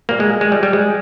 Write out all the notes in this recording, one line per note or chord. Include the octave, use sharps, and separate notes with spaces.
A#2 G3 A#3
G#3
G#3
G3
G3
G#3